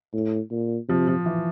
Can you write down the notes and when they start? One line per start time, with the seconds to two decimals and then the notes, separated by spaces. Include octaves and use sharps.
0.14 A2
0.51 A#2
0.88 C3 F3
1.08 F3
1.26 E3